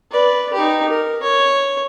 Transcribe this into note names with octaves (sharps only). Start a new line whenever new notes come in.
B4 D5
D#4 G4
A#4
C#5